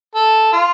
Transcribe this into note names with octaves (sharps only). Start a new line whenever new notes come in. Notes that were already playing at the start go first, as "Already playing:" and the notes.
A4
F4